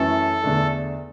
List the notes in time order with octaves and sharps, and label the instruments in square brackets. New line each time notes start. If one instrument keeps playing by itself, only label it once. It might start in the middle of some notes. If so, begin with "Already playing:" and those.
Already playing: [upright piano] F#2 E3 A3 C#4 [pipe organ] A4
[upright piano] E2 D3 A3 D4